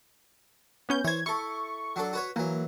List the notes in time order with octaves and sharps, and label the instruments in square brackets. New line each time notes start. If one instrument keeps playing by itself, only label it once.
[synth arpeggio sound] B3 C#4 G6
[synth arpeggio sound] E3 G#6 [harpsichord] C5 C#5
[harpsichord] E4 A4 [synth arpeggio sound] C#6
[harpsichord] F#3 D4 A4
F#4 B4 C#5
[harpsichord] E3 F#3 [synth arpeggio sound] A#3